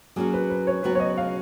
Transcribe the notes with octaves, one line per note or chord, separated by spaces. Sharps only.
F#3 A#3 C#4 F#4 G#4
B4
B4
C#5
C#3 F#3 B3 F#4 B4
C#5
D#5
F5